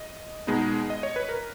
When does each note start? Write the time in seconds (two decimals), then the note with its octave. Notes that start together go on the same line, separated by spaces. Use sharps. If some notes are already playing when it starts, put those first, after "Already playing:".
Already playing: D#5
0.47 B2 G#3 B3 D#4
0.90 D#5
1.03 C#5
1.16 B4
1.29 A#4